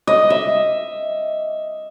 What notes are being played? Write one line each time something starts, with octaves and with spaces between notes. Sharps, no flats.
D#5
E5